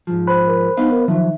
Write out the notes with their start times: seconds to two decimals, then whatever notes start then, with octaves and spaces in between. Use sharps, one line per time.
0.07 G#2 F3
0.27 C5 B5 F#6
0.46 A#4
0.77 B3 D#4 D#5 F5
0.90 A#4
1.08 D#3 F3 F#3 E5